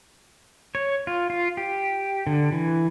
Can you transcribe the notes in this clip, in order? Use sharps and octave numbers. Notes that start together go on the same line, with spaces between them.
C#5
F4
F4
G4
D3
E3